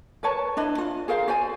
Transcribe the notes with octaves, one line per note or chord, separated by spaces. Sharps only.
A#4 B4 C#5 A5
D4 E4 B4 D#5
F4
G#4 A#4 C5 F5
F#4 C5 D5 G#5